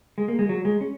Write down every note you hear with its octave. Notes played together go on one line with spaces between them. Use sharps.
G#3
A#3
G#3
F#3
G#3
C#4